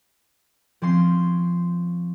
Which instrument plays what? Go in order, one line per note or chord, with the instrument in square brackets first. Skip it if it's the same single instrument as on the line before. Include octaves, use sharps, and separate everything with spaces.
[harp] F3 C4 C#4 C6 C7